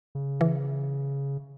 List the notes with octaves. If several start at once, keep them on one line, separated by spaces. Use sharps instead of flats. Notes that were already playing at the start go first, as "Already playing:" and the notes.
C#3
E3